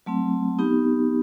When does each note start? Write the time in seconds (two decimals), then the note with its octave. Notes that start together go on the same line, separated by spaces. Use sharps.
0.06 F#3 A3 C4
0.59 B3 D#4 G4